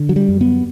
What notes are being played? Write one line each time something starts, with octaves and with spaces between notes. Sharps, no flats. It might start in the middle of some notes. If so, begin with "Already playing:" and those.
Already playing: D3
F#3
G3
F#2
B3